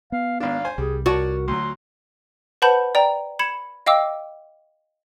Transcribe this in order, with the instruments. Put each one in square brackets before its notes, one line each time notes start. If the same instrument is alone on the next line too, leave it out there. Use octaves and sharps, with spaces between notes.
[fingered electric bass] B3 [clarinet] F5
[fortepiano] G#1 D4 [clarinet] F5
[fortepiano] C5 G#5
[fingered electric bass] C2 [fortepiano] G3 [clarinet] G#4
[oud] F#4 [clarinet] A#4 [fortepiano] C#5 D5 A5
[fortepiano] D2 F#3 [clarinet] C6
[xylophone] B4 C5 F#5 A5 B5 G6
D5 G5 A#5
B5 G#6 C#7 E7
D#5 F5 G5 D6 E6